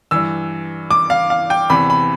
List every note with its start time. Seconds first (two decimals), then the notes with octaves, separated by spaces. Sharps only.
0.11 G2 E3 E6
0.91 D6
1.10 F5
1.30 F5
1.50 G5
1.69 E2 C3 E3 B5
1.90 B5